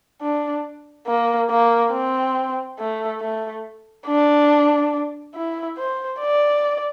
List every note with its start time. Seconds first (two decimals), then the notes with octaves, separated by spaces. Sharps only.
0.22 D4
1.08 A#3
1.51 A#3
1.93 C4
2.79 A3
3.21 A3
4.07 D4
5.35 E4
5.77 C5
6.21 D5